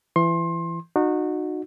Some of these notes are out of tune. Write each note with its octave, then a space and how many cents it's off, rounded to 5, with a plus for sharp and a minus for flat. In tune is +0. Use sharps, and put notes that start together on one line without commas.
E3 +30 C6 +25
D#4 -30 F#4 -20